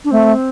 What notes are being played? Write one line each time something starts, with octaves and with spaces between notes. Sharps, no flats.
D4
A3 C4